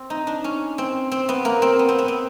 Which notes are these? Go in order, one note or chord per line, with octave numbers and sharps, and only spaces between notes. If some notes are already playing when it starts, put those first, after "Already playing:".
Already playing: C4
D#4
D4
C#4
C4
C4
B3
A#3
C4
B3
C4
B3
C4